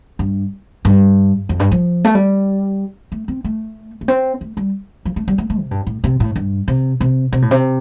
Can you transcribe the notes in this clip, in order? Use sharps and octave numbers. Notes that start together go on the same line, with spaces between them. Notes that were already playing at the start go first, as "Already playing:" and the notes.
G2
G2
F2
G2
F3
A3
G3
A3
C4
A3
A3
C4
A3
G3
F3
A3
G3
A3
A3
C3
G2
A2
C3
A2
G2
C3
C3
C3
A2
C3